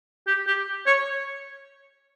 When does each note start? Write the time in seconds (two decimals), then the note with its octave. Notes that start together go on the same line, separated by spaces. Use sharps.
0.27 G4
0.47 G4
0.86 C#5